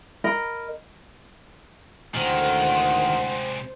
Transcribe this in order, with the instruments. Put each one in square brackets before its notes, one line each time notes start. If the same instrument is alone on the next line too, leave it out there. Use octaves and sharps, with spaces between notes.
[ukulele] A#4 D#5 B5
[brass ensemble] D2 A2 F#5 [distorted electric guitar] C3 G#3 [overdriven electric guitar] D#3 [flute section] C5